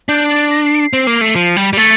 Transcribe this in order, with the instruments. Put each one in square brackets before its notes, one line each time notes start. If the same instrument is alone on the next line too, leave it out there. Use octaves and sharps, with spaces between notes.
[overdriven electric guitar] D4 [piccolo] G6
[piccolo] A6
A#6
C7
D7
C7
[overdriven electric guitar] C4
A#3
A3
F3
G3
G3
[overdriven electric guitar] A3 [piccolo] A6